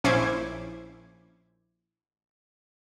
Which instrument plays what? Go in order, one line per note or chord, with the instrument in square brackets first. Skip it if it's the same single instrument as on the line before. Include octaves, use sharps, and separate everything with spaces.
[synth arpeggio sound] A#1 C#4 E4 C5 D6 G#6